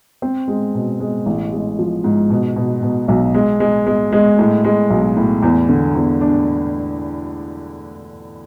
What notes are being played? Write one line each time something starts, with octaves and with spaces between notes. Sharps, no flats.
C4
G#3
B2
G#3
A1
G#3
F3
G#2
B2
B2
B2
B1
G#3
G#3
G#3
G#3
A2
G#3
B1
A2
E2
D3
E2
D4